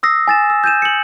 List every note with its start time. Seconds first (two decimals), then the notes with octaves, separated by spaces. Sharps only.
0.03 D#6 E6 A#6 C7
0.28 G#5 A6 E7
0.50 E6
0.64 G6 G#6 D#7 E7
0.82 C#7 F#7